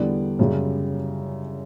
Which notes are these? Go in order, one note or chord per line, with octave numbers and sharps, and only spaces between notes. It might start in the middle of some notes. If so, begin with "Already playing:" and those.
Already playing: E2 D3 G3 B3 D5
F#2 C#3 G3